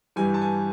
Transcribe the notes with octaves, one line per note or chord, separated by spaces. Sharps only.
G2 E3 G3 G#5
A5
G#5